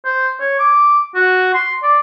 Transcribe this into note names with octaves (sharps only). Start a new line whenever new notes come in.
C5
C#5
D6
F#4
C6
D5